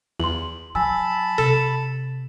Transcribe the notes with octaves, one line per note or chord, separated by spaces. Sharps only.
E2 C6 F#7
F#3 G#5 A5 B5 E6
C3 A4 E7